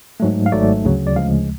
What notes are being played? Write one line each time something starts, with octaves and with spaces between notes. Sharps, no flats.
G#2 F#3 A3
F5
G#1 G#2 F#3 A3 D5
D2 C#3 F#3
D5
D2 C#3 F3 G#3 F5